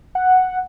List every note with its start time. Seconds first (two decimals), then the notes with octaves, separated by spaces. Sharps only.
0.15 F#5